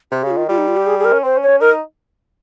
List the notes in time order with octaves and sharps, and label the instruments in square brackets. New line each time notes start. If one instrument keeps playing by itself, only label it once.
[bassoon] C3 [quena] G4
[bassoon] C#3 [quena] G4
[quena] F4
[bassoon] D#3
[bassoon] G3 [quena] F4
[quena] D#4
F4
G4
G#4
G#4
A#4
[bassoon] C#4
[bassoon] C4 [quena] C5
[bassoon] C#4
[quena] C#5
[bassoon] C#4
[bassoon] D#4 [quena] A#4